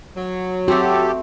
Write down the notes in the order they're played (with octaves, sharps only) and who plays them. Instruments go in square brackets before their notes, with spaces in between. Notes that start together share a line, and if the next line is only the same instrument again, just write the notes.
[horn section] F#3
[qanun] A3 C4 [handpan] F#4 [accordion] G4 A4